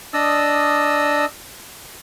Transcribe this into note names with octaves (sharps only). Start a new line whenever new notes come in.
D4 D5 D#5 D#6 E6